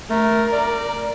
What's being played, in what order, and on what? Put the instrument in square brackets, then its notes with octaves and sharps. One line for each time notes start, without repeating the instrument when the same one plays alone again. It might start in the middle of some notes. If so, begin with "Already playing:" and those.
[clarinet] A3 [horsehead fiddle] A#4
[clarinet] D5